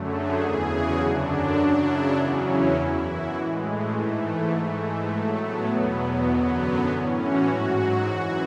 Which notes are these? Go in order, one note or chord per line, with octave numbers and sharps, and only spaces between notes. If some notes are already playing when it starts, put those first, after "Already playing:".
Already playing: F#2 D3 F#3 A3
G#4
E2 C#3 E3 G#4
F#4
F#2 D3 F#3 D4
F#2 C#3 F#3
E4
E2 C#3 F#3 C#4
E4
F#2 E3 E4
F#4
A2 E3 G#3
A3
G#2 E3 A3
G#2 E3 A3
G#3
A2 F#3 A3
B3
E2 B2 F#3
F#2 D3 F#3
B3
A2 E3 C#4
F#4
G#2 F#3
F#4
F#2 E3